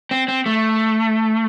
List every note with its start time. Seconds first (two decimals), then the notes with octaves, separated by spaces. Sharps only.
0.11 C4
0.28 C4
0.46 A3